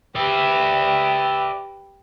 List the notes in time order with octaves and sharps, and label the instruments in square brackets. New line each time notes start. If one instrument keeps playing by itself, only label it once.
[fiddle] G4 B4 [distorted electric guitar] D5 E5